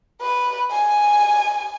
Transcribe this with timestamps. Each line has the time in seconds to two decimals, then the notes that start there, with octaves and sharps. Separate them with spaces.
0.22 B4
0.71 G#5